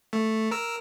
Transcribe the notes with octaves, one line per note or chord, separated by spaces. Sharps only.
A3
A#4 E6